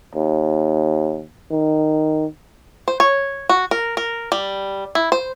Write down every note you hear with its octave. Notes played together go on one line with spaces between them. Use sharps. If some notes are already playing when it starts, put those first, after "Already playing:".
D#2
D#3
C5
C#5
F#4
A#4
A#4
G3
E4
C5